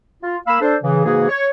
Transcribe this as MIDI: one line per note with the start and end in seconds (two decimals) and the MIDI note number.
0.23 0.38 65
0.47 0.58 58
0.47 0.58 77
0.47 0.58 83
0.47 0.58 88
0.61 0.76 62
0.61 0.76 69
0.61 0.76 72
0.83 1.05 49
0.83 1.05 52
1.06 1.29 44
1.06 1.29 49
1.06 1.29 52
1.06 1.29 58
1.06 1.29 66
1.06 1.29 68
1.29 1.48 73